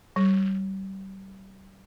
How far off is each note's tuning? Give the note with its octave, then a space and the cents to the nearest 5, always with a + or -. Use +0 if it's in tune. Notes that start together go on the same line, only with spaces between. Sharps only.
G3 -30